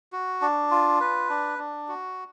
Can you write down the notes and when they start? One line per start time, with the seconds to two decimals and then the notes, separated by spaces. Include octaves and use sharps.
0.12 F#4
0.42 D4
0.71 F4
1.01 B4
1.29 D4
1.59 D4
1.88 F#4